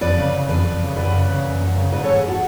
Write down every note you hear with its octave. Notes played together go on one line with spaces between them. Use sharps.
F2 B4 D5
C#3
C#3
F2 B4 D5
F2
C#3
F#2 B4 D5
C#3
C#3
F#2
F#2
C#3
G#2 B4 D5
A4 C#5
G#2
G#4 B4
F#4 A4